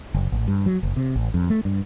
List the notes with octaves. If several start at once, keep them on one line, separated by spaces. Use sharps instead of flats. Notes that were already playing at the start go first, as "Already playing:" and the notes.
F#1
A1
G2
F#3
F#1
C3
A1
F2
A3
G2